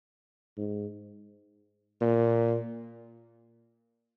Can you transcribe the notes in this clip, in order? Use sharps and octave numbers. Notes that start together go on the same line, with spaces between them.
G#2
A#2